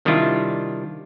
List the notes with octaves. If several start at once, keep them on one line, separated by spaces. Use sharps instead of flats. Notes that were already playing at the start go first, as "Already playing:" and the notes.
C3 D#3 G3 D4 E4 F4